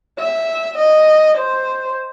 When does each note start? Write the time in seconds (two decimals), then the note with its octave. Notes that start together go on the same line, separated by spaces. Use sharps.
0.19 E5
0.77 D#5
1.37 C5